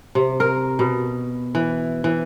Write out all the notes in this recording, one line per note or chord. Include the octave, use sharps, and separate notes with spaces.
C3
A#4
B2
E3
E3